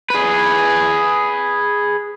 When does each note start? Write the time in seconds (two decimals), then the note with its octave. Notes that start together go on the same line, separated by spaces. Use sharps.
0.10 G#4 B4